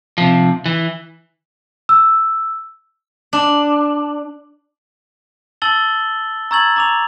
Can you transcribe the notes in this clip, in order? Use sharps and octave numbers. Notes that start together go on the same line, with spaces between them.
C3 F3
E3
E6
D4
A5 E6 A6 F#7 G7
A#5 C#6 E6 G#6 A6 F#7
A#5 D6 F7